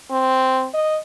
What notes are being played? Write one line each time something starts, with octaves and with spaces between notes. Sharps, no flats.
C4
D#5